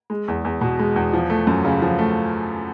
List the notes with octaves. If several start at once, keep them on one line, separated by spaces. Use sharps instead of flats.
G#3
E2
E2
B2
G#3
E2
F3
A3
F#2
C#3
F3
A3